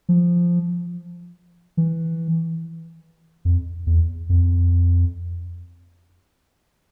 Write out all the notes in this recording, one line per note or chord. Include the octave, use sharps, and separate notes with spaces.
F3
E3
F2
E2
F2